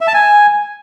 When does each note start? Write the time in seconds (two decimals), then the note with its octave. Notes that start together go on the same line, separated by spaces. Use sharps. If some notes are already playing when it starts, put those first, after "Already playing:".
0.01 E5
0.07 A5
0.14 G#5